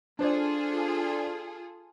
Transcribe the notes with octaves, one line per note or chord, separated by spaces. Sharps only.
D4 F4 G#4 A4 C5 D5